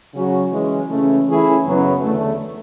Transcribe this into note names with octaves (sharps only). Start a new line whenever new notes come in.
C#3 F#3 C#4 F#4
E3 G#3 C#4
C#3 E3 A3 C#4
E3 A3 C#4 E4 G#4
F#2 C#3 F#3 B3
E2 D3 A3